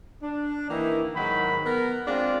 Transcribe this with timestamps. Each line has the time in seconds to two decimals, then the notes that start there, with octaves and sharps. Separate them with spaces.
0.22 D4
0.70 D#3 E3 A#3 D#4 E4
1.16 G#2 D#3 F#3 G5 B5
1.65 B3 A#4
2.07 G#3 C4 D4 F4